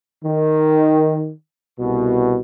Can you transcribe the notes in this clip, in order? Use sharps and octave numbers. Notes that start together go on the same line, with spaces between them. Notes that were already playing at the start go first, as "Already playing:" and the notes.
D#3
C2 B2